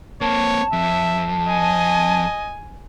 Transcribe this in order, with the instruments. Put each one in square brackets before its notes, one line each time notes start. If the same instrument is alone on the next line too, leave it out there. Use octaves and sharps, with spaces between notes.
[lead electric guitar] A#3 C4 [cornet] C#5 [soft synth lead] A5
[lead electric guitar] F2 [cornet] E5
[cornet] D#5 [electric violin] G#5